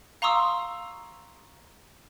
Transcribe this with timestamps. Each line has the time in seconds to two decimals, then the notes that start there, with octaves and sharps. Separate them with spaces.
0.22 F5 A#5 C6 C#6 D#6 E6